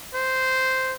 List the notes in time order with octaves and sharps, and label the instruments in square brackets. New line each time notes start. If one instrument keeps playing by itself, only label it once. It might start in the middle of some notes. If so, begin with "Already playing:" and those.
[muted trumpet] C5